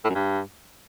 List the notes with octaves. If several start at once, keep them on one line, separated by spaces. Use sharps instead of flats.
A2
F#2
G2